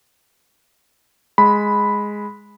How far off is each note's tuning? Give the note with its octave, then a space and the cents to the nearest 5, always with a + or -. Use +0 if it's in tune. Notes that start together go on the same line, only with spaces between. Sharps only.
G#3 +0 B5 +0